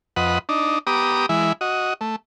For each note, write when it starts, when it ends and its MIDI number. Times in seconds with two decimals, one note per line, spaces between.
0.16 0.38 41
0.16 0.38 71
0.16 0.38 75
0.16 0.38 78
0.49 0.79 62
0.49 0.79 63
0.87 1.26 59
0.87 1.26 67
0.87 1.26 82
0.87 1.26 86
0.87 1.26 87
1.29 1.53 52
1.29 1.53 56
1.29 1.53 64
1.61 1.94 66
1.61 1.94 75
2.01 2.16 57